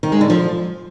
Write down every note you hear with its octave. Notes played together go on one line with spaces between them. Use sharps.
D#3
G#3
D3
F3